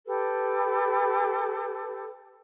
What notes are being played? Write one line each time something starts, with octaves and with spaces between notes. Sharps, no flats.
G4 A4 B4